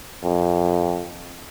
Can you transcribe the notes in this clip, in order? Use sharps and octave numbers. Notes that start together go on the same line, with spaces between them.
F2